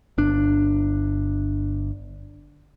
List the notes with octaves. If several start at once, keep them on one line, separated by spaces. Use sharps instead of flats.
G1 D4